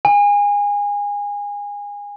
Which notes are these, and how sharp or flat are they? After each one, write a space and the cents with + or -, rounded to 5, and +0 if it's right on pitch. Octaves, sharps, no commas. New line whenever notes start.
G#5 -25